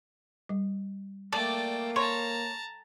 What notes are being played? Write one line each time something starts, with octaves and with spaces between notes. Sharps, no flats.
G3
A3 A#3 D5 G5 A5
C#5 A5 A#5 C6